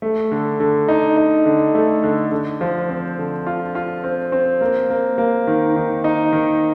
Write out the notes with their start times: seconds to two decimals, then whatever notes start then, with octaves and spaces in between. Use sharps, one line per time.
0.02 A3
0.31 D3
0.60 D3
0.88 D#4
1.17 D#4
1.46 D3
1.75 A3
2.04 D3
2.32 D3
2.61 F3
2.89 C4
3.18 D3
3.47 F4
3.75 F4
4.04 C4
4.32 C4
4.61 A#3
4.90 A#3
5.18 A#3
5.47 D#3
5.76 D#3
6.04 D#4
6.32 D#3